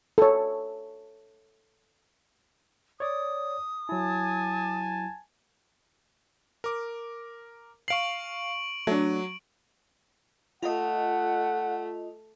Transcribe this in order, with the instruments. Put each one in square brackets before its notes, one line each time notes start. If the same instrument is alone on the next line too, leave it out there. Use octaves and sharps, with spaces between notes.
[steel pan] A4 C#5
[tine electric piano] C#5 D5 [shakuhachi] D#6
[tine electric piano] F#3 E4 [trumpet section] G#5 A5
[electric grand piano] A#4 D6
[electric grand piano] F5 C7 [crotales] C#6 D7 F#7
[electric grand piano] F#3 [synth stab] A3 D4
[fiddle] A3 [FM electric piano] F4 D#5 [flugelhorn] F#5